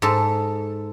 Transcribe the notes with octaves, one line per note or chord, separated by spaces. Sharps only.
G#2 A4